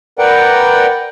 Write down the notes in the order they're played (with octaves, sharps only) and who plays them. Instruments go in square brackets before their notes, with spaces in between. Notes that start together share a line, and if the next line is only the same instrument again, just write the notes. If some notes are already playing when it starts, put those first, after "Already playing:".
[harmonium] A#4 B4 D5 F#5 G5